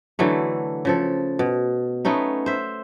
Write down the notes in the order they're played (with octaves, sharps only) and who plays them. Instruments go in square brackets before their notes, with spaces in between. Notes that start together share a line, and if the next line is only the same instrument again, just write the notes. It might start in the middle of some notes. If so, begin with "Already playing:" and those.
[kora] D3 E3 F#3 A3
C#3 F3 A4
B2
A3 B3 C#4 D#4
C5 E5